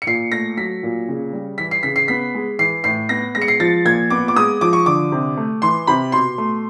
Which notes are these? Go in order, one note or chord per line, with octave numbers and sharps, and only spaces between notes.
C#7
A#2 C7
A3 A#6
F#3 B6
A#2
C#3
G3
E3 B6
C7
C#3 B6
C7
B3 B6
G#3
E3 C7
A2 C7
B3 A#6
G#3 A#6
C#7
C7
F3 A6
A#2 G#6
B3 D6
D6
G#3 D#6
F3 D6
C#6
D3 D6
C3
A3
E3 C6
C3 B5
B2 C6
A3